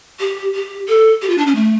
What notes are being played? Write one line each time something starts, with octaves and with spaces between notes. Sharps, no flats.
G4
G4
A4
G4
F4
D4
C#4
A3